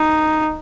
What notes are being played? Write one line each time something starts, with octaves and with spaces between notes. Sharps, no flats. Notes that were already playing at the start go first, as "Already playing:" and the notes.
Already playing: D#4